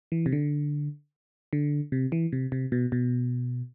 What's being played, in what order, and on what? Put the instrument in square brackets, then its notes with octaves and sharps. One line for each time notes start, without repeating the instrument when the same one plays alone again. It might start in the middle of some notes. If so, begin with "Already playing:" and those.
[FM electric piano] E3
C3
D3
D3
C3
E3
C3
C3
B2
B2